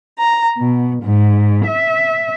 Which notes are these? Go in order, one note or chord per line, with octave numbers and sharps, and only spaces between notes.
A#5
B2
G#2
E5